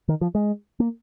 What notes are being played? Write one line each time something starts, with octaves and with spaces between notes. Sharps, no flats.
D#3
F3
G#3
A#3